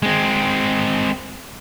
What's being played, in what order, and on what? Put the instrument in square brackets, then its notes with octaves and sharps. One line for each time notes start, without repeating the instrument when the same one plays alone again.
[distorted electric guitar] G#3 C4